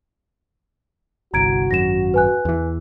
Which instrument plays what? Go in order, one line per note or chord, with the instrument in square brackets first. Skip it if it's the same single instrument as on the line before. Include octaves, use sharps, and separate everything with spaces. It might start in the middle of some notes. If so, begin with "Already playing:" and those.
[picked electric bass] G1 C2 [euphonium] F#4 [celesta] A#5 G#6 D7
[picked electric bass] G#1 F#2 [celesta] A#6 E7
[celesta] B4 G#5 F#6
[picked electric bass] E2 E3